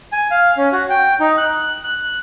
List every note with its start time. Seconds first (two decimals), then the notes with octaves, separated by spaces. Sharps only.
0.12 G#5
0.31 F5
0.57 C#4
0.72 F#4
0.90 G5
1.20 D#4
1.38 F#6
1.84 F#6